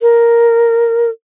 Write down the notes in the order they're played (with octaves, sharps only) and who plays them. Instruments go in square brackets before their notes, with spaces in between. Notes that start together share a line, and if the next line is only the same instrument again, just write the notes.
[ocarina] A#4